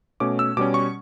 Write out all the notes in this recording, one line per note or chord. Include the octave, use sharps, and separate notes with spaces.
B2 A3 C#4 D6
E6
B2 G3 C#4 D6
C#6